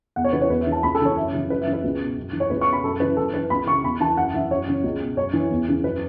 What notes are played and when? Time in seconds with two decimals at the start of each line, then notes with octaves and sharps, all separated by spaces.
0.16 E2 F#5
0.24 C#5
0.33 E3 B4
0.38 C#3 C#5
0.50 E2 B4
0.61 E5
0.67 E3
0.72 A5
0.83 C#2 B5
0.95 A4
1.01 C#3 E3 C#5
1.16 F#2 E5
1.33 C#3 E3
1.50 F#2 B4
1.61 E5
1.67 E3
1.73 B4
1.83 C#2
2.00 B2
2.17 F#2
2.33 E3
2.40 C#5
2.50 C#2 B4
2.61 C#6
2.67 B2
2.73 B5
2.83 F#2 A4
3.00 C#3 E3 B4
3.17 F#2 A4
3.34 E3 B4
3.50 C#2 B5
3.66 E3 C#6
3.71 C#3
3.84 E2 B5
4.00 E3 A5
4.17 F#2 F#5
4.34 E3 E5
4.51 F#2 C#5
4.67 C#3 E3
4.83 C#2
5.01 B2
5.17 F#2 C#5
5.33 E3
5.51 E2
5.67 C#3 E3
5.84 F#2 B4